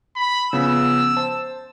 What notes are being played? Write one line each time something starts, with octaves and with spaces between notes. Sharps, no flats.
B5
C#3 F3 B3 E6
C5 A5